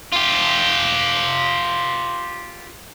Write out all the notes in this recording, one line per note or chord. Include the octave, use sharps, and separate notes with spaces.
F4 G4